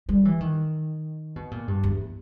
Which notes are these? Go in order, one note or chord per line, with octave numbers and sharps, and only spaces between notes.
G3
E3
D#3
B2
A#2
G2
E2